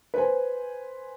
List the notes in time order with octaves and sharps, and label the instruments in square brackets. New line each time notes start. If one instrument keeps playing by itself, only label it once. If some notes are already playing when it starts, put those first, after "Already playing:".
[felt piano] B4 C5 G#5